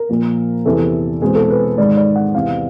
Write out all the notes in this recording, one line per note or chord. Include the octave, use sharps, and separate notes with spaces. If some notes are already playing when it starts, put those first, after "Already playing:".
Already playing: A#4
A#2 F3 A#3
E2 C3 E3 A4
E2 B2 G#3 C4 G#4
A4
B4
G#2 D#3 G#3 D5
D5
F#5
E2 C3 E3 F5